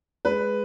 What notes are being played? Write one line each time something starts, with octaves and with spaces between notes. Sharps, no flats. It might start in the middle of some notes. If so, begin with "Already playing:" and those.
G#3 B4